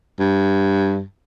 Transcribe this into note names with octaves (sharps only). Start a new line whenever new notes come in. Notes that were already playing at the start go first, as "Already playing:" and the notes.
G2